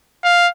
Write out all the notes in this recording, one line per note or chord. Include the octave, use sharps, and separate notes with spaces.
F5